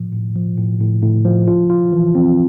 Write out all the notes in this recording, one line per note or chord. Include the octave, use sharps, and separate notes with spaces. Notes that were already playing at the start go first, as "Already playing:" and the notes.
Already playing: A2 F3
A2
F3
A2
A2
A2
F3
F4
F4
E3
C4